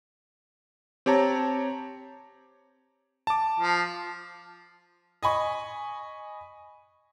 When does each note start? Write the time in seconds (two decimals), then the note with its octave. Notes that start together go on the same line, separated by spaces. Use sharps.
1.06 C4 G4 C#5 A5 A#5
3.27 A5 D6
3.60 F3
5.23 D#5 G#5 B5 C#6